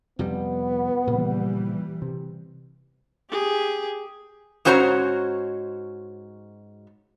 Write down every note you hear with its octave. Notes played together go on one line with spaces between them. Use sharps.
F2 C3 G3 B3
A#2 C#3 E3 F3 G3
C3
G4 G#4
G#2 C#4 F#4 C5 C#5 A#5